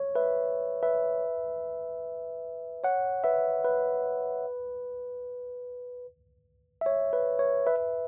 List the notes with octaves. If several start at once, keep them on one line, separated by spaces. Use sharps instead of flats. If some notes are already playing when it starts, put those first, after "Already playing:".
Already playing: C#5
B4 E5
B4 E5
C#5 F#5
B4 E5
B4
E5
C#5
B4
C#5
B4 E5